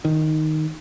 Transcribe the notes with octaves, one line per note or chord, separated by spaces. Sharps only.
D#3